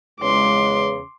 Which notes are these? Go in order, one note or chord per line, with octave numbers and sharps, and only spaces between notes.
E2 C#3 G#3 C6 D6